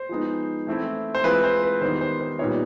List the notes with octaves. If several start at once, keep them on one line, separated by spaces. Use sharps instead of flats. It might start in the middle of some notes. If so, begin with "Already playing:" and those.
Already playing: C5
F3 G#3 B3 D#4
E3 A3 C4 E4
C5
E3 G#3 C4 F4 B4
C5
B4
D#3 G3 B3 D#4 C5
C5
C5
A#2 G3 B3 D#4 C#5